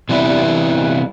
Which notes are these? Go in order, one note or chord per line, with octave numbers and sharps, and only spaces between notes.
C3 E3 G3 B3 E4 B4